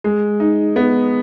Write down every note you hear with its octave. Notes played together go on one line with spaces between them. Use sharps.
G#3
D#4
B3